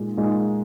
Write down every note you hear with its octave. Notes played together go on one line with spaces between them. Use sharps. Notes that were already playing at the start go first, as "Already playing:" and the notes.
Already playing: A#2 G#3 D#4
A#2 G#3 D#4